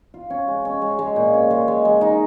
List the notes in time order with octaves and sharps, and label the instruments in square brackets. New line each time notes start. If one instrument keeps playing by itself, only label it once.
[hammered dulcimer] F4
C#4
G#3
C#4
G#3
G#3
A#2
C#4
G#3
G#3
G#3
D#4